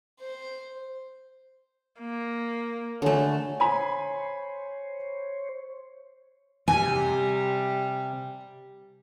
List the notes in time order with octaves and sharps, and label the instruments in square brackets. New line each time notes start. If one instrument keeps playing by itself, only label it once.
[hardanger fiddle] C5
[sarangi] A#3
[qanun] D3 A3 [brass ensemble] C#5 G#5
[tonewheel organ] C5 C#5 [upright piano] G#5 B5 C6
[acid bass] C3 [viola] G3 [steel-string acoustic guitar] G#5